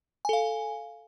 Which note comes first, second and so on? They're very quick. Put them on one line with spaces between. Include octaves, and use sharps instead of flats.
G#5 A4 F5